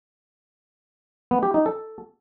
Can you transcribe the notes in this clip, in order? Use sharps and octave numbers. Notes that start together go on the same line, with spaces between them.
B3
G4
D#4
A4